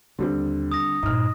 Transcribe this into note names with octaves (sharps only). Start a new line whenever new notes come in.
D#2 D3 G3 C4
D#6 A#6
G2 A#2 D#4 F6